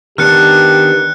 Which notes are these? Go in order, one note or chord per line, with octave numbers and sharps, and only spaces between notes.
D#3 B3 D4 G4 F6 F#6 C#7